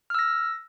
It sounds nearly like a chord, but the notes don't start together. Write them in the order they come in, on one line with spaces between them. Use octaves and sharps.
F6 E6 A#6